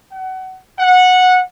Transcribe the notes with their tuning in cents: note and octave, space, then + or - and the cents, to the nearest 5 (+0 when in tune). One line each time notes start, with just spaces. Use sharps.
F#5 +25
F#5 -15